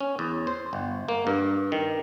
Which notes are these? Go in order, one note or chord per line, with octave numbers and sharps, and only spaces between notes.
C#4
E2
C5
G1
A#3
G2
D#3